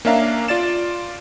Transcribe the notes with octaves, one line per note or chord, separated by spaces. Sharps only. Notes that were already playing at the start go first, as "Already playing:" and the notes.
A#3 C#4 D4 E5 F5 A#5
F4 D5 A6 E7